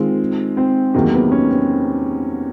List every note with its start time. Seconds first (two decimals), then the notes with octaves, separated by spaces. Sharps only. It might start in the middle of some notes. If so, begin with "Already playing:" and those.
Already playing: D#3 G#3 C4 F4
0.57 C4
0.94 E2 C3 D#3 F#3 A#3 C4
1.13 B3
1.32 C#4
1.51 C4